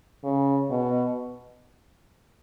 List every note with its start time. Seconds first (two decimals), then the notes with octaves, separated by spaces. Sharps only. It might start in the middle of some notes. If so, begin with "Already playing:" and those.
0.24 C#3
0.70 B2